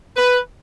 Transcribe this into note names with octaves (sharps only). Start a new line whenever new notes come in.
B4